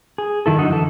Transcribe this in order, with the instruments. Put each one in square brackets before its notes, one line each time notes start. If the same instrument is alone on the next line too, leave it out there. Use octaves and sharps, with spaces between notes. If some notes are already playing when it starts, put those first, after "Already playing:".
[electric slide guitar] G#4
F#2 D#3 E4 A4
F#2 D3 D#4 F#4
D3 E3 A4